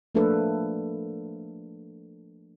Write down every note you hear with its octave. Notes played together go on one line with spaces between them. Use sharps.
F3 A3 A#3 D4 A4 B4